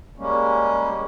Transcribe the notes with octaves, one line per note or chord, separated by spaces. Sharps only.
G3 G#3 A#3 C#4